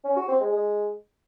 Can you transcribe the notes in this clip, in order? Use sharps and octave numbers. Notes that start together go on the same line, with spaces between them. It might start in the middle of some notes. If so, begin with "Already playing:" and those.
C#4
F#4
C4
G#3
G#3